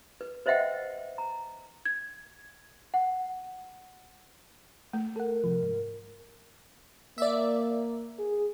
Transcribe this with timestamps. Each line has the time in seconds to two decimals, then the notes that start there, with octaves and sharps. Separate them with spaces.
0.21 B4
0.46 B4 C5 D#5 E5 F#5 G5
1.18 A#5
1.85 G#6
2.94 F#5
4.93 A3
5.16 A4 A#4 F#5
5.44 C3 F3
5.63 G#2
7.18 A#3 D5 E5
8.19 G#4